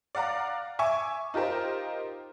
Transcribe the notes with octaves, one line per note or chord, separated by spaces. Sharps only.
D5 F5 F#5 A#5
E5 G#5 C#6 D6
D#4 F4 G4 A#4 C5